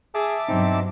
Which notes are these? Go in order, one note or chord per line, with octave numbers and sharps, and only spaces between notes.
G#4 E5 A5 D6
G2 B2 F#3 C4 D#4